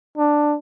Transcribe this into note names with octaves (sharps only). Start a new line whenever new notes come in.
D4